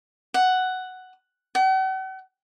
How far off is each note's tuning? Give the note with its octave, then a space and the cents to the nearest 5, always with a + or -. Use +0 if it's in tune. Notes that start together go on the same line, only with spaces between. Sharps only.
F#5 +5
F#5 +45